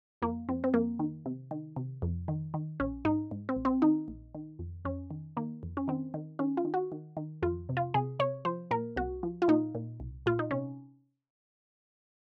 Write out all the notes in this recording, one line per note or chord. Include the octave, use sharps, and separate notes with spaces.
F2 A#3
F2 C4
C4
F2 A#3
D#3
C3
D#3
C3
F2
D#3
D#3
A#1 C#4
G#2 D#4
G#2
C4
A#1
C4
D#3 D#4
A#1
D#3
F2
F2 C#4
D#3
D#3 A#3
F2
C#4
D#3 C4
D#3
D#3 C#4
F4
D#3
F#4
D#3
D#3
F2 F4
C3
F4
C3 G#4
C3 C#5
F3 C5
A#2 A#4
C2 F#4
F3
F4
A#2 D#4
A#2
C2
A#2 F4
D#4
C3 C#4